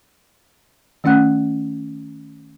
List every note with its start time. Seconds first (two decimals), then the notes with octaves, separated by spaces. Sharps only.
1.04 D#3 A3 C#4 F#5 F#6